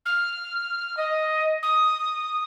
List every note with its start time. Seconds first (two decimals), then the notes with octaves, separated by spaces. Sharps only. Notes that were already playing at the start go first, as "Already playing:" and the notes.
0.05 F6
0.97 D#5
1.62 D#6